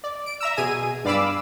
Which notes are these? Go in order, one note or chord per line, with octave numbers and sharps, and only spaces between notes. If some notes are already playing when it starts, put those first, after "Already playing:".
D5
D7
E5 A#5 E6
B2 G#4 G#5 D#7
G2 D5 F5 B5 D6 E6